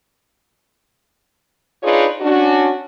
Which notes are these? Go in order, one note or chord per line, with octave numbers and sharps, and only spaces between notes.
D4 D#4 F4 G#4 B4 C#5
C#4 D4 F#4